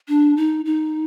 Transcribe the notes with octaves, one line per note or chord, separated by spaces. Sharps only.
D4
D#4
D#4